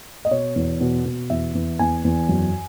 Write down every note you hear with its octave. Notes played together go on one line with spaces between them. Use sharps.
D#5
B2 C#5
E2
B2
B2
E2 E5
E2
E2 G#5
E2
F#2